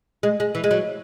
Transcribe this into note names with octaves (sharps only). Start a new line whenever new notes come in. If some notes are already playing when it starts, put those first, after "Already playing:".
G#3
G#3
E3
G#3
F#3